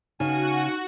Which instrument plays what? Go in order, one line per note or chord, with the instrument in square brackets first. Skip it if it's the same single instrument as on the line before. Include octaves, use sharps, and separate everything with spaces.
[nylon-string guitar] C#3 [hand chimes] D#4 [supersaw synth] F#4 [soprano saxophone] G#5